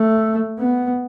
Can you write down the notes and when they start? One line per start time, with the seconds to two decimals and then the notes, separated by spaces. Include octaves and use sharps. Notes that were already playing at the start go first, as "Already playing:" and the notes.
Already playing: A3
0.59 B3